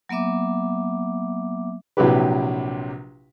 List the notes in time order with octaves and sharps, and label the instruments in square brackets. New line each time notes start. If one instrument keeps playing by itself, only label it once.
[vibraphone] F#3 A#3 B3 E5 D6
[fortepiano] A#1 C3 F#3 E4 G4 B4